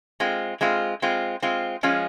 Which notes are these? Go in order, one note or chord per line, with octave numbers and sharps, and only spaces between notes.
G#3 C4 F4
G#3 C4 F4
G#3 C4 F4
G#3 C4 F4
F3 G#3 C#4 F4